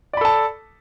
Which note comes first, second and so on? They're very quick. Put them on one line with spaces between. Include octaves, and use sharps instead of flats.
D5 B5 A4 A5